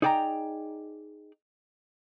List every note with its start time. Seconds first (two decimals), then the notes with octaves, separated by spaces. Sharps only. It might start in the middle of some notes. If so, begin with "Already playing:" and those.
0.02 D#4 G#4 D5 G5 G#5 A#5